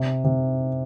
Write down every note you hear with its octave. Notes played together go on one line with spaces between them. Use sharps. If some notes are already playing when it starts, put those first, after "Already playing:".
Already playing: C3
C3